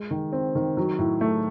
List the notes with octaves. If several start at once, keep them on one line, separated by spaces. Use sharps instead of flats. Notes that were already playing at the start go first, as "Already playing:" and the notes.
Already playing: G#3
D#3
C4
D#3
F#3
A2
A3